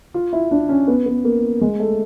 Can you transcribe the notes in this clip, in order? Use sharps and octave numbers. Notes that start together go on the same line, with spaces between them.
F4
E4
D4
C#4
B3
B3
A#3
G#3
A3